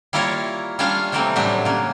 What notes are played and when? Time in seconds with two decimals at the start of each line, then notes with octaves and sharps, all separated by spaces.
0.13 G3 A#3 E4 F4 A#4 C#5
0.79 G3 C#4 D4 F4 F5
1.12 C3 E3 G3 A3 A#3 C4
1.36 A2 E3 F#3 G3 D4 G4
1.65 C#3 A#3